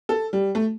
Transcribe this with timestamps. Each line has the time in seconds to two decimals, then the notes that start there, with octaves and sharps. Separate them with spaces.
0.09 A4
0.33 G3
0.55 A3